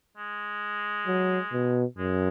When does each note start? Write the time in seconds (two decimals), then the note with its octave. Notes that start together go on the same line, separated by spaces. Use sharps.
0.17 G#3
1.07 F#3
1.53 B2
1.98 F#2 G#3